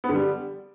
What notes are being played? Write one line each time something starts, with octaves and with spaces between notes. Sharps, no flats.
B3
D3
G3